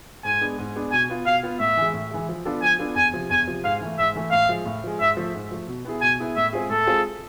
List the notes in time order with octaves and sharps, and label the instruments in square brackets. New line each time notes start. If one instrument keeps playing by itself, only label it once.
[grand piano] G#2 [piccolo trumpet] G#5
[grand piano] G#3 B3 D4
G#2
G#3 B3 D4
[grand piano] B2 [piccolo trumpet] G#5
[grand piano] B3 F4
[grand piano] B2 [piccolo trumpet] F5
[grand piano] B3 F4
[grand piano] A2 [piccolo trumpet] E5
[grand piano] E3 G#3
A2
E3 G#3
F3
B3 D4 F4 A4
[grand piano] F3 [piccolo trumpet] G#5
[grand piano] B3 D4 F4 A4
[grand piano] E2 [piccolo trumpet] G#5
[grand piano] C3 F3
[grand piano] E2 [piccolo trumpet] G#5
[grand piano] C3 F3
[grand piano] G#2 [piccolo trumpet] F5
[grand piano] E3 A3
[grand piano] G#2 [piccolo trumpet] E5
[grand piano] E3 A3
[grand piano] A2 [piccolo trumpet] F5
[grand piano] F3 G#3
A2
F3 G#3
[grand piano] G#2 [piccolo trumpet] E5
[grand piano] F3 A3
G#2
F3 A3
B2
B3 E4 G#4
[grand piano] B2 [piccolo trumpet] G#5
[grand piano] B3 E4 G#4
[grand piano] A2 [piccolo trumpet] E5
[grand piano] G#3 C4 F4 G#4
[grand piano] A2 [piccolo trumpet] A4
[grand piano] G#3 C4 F4 G#4